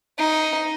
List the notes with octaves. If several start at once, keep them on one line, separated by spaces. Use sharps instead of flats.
D#4